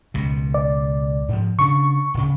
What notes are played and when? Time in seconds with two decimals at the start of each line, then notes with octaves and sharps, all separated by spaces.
0.14 C#2 B2
0.54 D5
1.29 G#2 F3
1.59 C#3 D4 C#6
2.14 D1 C#3